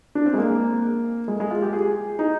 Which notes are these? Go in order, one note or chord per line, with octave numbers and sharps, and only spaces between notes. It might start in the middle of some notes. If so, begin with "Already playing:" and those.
D4
C4
G#3
A#3
G#3
G#3
F4
G4
G#4
D#4